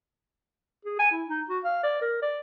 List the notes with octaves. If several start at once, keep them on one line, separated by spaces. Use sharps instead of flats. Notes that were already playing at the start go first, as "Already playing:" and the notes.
G#4
G#5
E4
D#4
F#4
F5
D5
A#4
D5